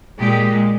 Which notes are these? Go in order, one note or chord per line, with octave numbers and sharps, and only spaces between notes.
A#2 G#3 G4